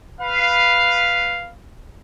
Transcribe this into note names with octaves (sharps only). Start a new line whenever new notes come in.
B4 F5